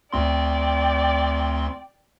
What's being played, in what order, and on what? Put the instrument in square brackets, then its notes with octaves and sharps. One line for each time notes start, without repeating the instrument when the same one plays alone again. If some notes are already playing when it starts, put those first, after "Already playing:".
[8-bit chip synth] D2 C4 C6 [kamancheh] D5 G5